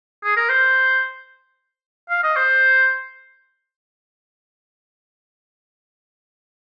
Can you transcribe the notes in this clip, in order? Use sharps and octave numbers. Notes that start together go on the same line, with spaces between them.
G#4
A#4
C5
F5
D#5
C5